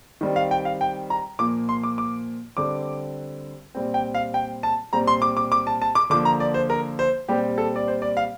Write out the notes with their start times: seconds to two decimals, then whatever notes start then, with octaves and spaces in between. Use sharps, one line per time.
0.21 D#3 G3 C4
0.36 F5
0.51 G5
0.65 F5
0.81 G5
1.10 A#5
1.39 A#2 F3 A#3 D6
1.69 C6
1.83 D6
1.98 D6
2.57 D3 G3 C4 D6
3.75 A#2 G3 C4
3.94 G5
4.15 F5
4.34 G5
4.63 A5
4.93 A#2 G3 C4 A#5
5.07 C6
5.22 D6
5.37 D6
5.52 D6
5.67 A5
5.82 A5
5.95 D6
6.10 D3 F3 A#3 D6
6.25 A#5
6.40 D5
6.54 C5
6.70 A#4
6.99 C5
7.28 A#2 G3 C4 G4
7.58 A4
7.76 D5
7.88 C5
8.02 D5
8.17 F5